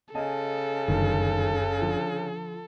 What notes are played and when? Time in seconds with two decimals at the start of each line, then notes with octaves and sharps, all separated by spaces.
0.14 C#3 A4 D#5 G#5 A5
0.88 F#1 D2 G2 D#3
1.77 D3 F3